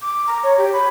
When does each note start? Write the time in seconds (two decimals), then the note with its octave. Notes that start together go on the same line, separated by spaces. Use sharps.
0.02 D6
0.27 A#5
0.44 C#5
0.58 G4
0.73 B5